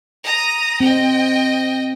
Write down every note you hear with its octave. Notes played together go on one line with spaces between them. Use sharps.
A#5 D#6
C4 D#5 G5